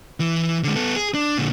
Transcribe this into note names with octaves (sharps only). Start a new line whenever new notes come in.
E3
D3 G#3
B3 A4
G#4
D4
A#2 D3